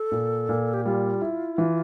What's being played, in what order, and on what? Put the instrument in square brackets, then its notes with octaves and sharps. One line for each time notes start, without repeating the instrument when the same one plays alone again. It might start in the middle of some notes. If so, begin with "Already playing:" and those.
Already playing: [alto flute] A4
[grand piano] A#2
A#2
[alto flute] G4
[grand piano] G3 [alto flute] F4
[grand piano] E4
E3